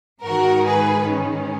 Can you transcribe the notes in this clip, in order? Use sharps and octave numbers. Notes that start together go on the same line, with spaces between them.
G#2 D#3 G#3 F#4 A#4
G#4 B4
C#4